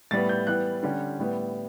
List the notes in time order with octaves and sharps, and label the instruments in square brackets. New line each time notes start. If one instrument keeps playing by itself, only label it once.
[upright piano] A2 G3 B3 A6
G6
E3 G3 B3 F#6
D3 G3 C#4
A2 G3 B3